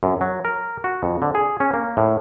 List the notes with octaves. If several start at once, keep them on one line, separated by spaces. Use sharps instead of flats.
F#2
F#3
A#4
F#4
F2
D3
G#4
C#4
A#3
A2